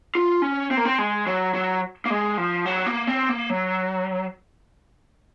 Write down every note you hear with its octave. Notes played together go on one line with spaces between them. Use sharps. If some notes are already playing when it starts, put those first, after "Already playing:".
F4
C#4
C4
A#3
C4
G#3
F#3
F#3
A#3
G#3
F3
F#3
A#3
C4
A#3
F#3